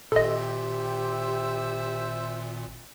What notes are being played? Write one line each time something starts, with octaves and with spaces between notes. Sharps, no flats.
G#1 A#2 G4 A4 C5 D#5 E5